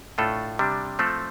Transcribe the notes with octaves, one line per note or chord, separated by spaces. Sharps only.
A2 A3 D4 F4 A4
C3 G3 D4
F3 A3 C4 A4